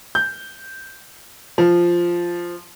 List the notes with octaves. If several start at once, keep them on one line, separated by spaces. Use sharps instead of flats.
G6
F3